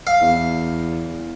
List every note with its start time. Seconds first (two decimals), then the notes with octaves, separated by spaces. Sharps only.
0.07 F5
0.21 E2